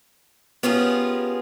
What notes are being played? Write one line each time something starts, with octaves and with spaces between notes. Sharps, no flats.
B3 C#4 F4 G4 G#4 A#4